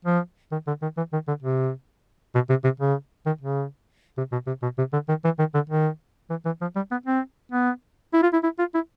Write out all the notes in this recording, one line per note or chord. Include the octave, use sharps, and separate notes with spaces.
F3
D#3
D3
D#3
E3
D#3
D3
C3
B2
C3
C3
C#3
D#3
C#3
C3
B2
C3
B2
C3
D3
D#3
E3
D#3
D3
D#3
E3
E3
F3
G3
B3
C4
B3
E4
F4
E4
E4
F4
E4